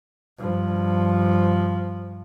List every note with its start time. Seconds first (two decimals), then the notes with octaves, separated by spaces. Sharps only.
0.38 G2 F3